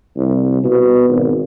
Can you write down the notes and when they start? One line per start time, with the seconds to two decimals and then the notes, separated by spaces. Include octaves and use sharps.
0.17 C2
0.64 B2
1.09 G#1